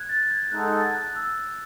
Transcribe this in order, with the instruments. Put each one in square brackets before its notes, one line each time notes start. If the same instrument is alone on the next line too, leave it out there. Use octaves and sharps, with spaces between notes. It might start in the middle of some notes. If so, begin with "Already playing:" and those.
Already playing: [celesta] F#6 G#6
A6
G#6
[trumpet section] G#3 D#4 A4 D#5 F#5 [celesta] F#6
[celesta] A6
G#6
F#6
E6